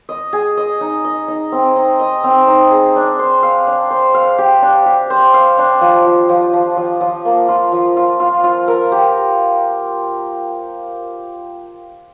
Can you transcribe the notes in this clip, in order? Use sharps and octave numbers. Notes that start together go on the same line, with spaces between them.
D#5
G#4
D#5
D#4
D#5
D#4
C4
D#4
D#5
C4
D#4
G#4
D4
C5
F5
D4
C5
F5
G4
D4
G4
C5
F5
D4
F3
F3
F3
F3
F3
F3
A#3
F4
F3
F4
F4
F4
A#4
G4